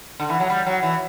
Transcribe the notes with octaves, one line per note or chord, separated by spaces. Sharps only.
D3
E3
F#3
G3
F#3
E3